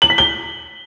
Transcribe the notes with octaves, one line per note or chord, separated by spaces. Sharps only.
F#7
B6
G7